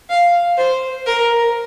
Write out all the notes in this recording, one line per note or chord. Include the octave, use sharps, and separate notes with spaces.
F5
C5
A#4